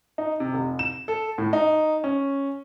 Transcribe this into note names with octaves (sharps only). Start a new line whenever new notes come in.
D#4
C3
F1
E7
A4
A2
D#4
C#4